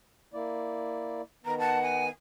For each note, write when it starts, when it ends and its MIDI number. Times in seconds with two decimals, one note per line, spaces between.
0.34 1.22 58
0.34 1.22 64
0.34 1.22 74
1.44 2.09 51
1.44 2.09 59
1.44 1.54 82
1.59 2.04 78
1.59 1.80 81
1.82 2.08 80